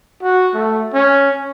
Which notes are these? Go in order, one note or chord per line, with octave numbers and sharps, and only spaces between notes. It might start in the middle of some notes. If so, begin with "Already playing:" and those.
F#4
A3
C#4